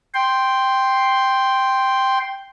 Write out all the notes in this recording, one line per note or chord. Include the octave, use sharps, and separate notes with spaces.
G5 C6